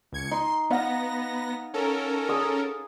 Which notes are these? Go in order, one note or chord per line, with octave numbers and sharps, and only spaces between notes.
C#2 G#6 C#7
D#4 C6
B3 D#4 F5 F#5 A#6
C#4 A4 A#4
G#4 D#6